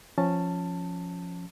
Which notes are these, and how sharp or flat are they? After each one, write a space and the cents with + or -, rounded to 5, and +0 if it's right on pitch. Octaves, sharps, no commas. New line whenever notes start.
F3 +0 C#4 +0 A5 +10